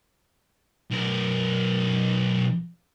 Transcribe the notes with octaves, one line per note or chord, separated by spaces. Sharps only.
B1 A#4